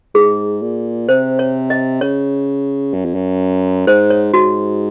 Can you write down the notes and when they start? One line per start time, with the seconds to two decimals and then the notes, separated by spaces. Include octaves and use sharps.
0.15 G#2 G#4
0.62 A#2
1.09 C3 C5
1.39 C#5
1.70 D#5
2.01 C#3 C#5
2.94 F#2
3.05 F2
3.15 F#2
3.87 G#2 C5
4.10 C#5
4.34 G#2 F#4